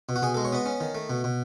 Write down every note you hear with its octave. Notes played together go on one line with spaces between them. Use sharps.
B2
F#4
B2 G#4
A4
G#3
C#5
B3 D#5
C#4
D#3
A3
B2
B2